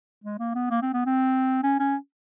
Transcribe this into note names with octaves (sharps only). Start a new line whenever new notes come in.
G#3
A#3
B3
A#3
C4
B3
C4
C#4
C#4